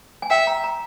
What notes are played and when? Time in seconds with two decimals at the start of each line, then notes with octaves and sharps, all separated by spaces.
0.22 G#5
0.30 E5 G5
0.47 A#5
0.64 A#5